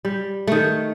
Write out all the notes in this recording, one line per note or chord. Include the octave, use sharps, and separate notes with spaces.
G3
D#3 A3